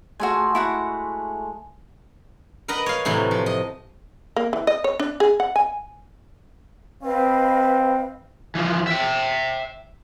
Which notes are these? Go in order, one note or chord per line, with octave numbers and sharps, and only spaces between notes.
G#3 A3 F#4 G#4 G#5
E4 F#4 F#5
A#4 B4 D#5 F#5 A#5
C#5 F5
A2 C3 E3 F#3
F3
D#5
A#3
E3
D#5
C#5
D4
G#4
F#5
G#5
C4 B4 D#5 F5
E3 F3
E5 G5